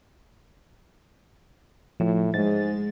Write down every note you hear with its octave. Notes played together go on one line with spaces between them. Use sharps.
A2 F3
G#2 G#3 A6